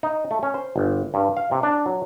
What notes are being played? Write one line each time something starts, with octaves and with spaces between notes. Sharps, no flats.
D#4
A3
C#4
C5
G1
G2
F5
C3
D4
F#3